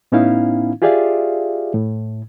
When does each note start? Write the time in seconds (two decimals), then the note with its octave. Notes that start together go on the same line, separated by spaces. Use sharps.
0.12 A2 B3 C#4 D#4 E4 F5
0.82 F4 G4 G#4 D5 E5 F5
1.74 A2